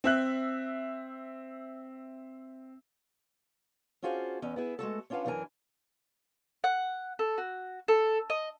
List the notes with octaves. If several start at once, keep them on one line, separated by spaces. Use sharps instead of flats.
C4 E5 F#6
C#4 D4 F4 F#4 G#4 C5
E2 C#4 D5 D#5
B3 E4 G#4
G#3 A3 F#4 A4
C#4 D4 F4 B4 F5 F#5
F#2 E3 D4 F#4 A#4 G#5
F#5
A4
F#4
A4
D#5